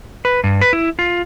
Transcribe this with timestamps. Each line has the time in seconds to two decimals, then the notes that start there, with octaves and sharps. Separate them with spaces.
0.25 B4
0.44 G2
0.61 B4
0.73 E4
0.99 F4